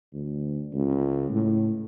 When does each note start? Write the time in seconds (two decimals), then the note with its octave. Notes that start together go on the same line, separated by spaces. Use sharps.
0.13 D2
0.73 C#2
1.30 A2